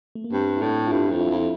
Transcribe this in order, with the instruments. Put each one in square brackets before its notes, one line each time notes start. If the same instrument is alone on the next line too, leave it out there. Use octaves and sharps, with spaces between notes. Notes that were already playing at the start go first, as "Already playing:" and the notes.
[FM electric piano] A3
A#3
[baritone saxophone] G2 [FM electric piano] C4
[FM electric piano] E4
[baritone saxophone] A2 [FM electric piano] D4
[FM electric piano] F4
[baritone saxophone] G2 [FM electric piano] E4
[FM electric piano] F4
[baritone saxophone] F2
[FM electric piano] E4
[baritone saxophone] F2
[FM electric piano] E4